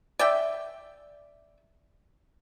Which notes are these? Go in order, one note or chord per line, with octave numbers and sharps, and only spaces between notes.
D5 E5 G5